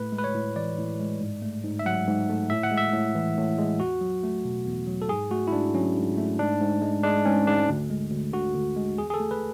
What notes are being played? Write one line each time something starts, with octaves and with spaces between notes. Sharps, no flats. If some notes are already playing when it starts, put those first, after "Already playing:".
Already playing: A2 A3 B4
G#3
B4
C#5
A2
E3 D5
A2
G#3
G#2
A3
G#2
E5
F#3 F#5
G#2
A3
A2 E5
F#5
G#3
E5
A2
E3
A2
G#3
E2 F#4
F#3
A3
B2
E2
F#3
A4
G#2 G#4
A3 F#4
E4
G#2 D4
F#3 C#4
G#2
A3
G#2 D4
G#2
G#3
G#3 D4
G#2 C#4
G#2 D4
D2
G#3
D2
D3 F#4
D2
G#3
E2 G#4
G#4
A4
A3
B4